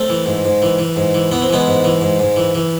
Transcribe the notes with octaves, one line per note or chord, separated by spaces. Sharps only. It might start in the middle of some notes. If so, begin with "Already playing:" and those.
Already playing: A3 C4
E3
G#2
G#2
E3
E3
G#2
E3
E3 B3
C4
E3 G#3 B3
G#2
E3
G#2
G#2
E3
E3